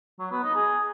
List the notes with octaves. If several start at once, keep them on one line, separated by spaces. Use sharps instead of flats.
F#3
B3
D#4
G#4